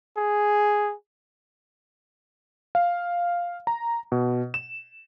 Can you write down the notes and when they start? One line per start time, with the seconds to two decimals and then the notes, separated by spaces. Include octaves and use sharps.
0.17 G#4
2.75 F5
3.67 A#5
4.12 B2
4.54 E7